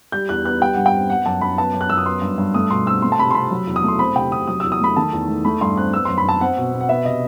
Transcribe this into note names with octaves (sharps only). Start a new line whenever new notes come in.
G3 G6
E2 F#6
B3 F#6
G3 G5
G2 F#5
G5
C4
B3 F#5
F#2 A5
F#2 B5
B3 A5
F#2
F#6
F#2 E6
D#6
B3 C6
G2
G2
A3 D#6
B2 C6
C4 E6
A3 C6
A5
C3 B5
C6
C3 B5
F#3
E2
D#6
A3 C6
C4 B5
C3 G5
C3 D#6
F#3 D#6
E6
E2
D#6
A3 B5
D#3 A5
E2
A3
A3 B5
G2 C6
C4 F#6
B3 E6
F#2 C6
B5
F#2 A5
C4 F#5
B2
B2
F#5
B3 E5
C3 D#5